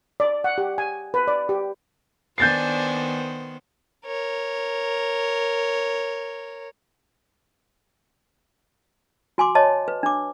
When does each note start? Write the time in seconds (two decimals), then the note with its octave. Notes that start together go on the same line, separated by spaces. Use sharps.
0.20 D5
0.44 F#5
0.58 G4
0.78 G#5
1.14 B4
1.28 D5
1.49 G4
2.38 D#3 B3 D4 C5 G#5 G6 A6 C7
4.06 A#4 C#5
9.38 F#4 G#5 C6 D6
9.55 C#5 D#5 A5
9.88 B4
10.03 D4 D6